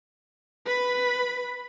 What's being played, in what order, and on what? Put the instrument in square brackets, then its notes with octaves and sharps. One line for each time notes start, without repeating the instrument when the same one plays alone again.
[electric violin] B4 B5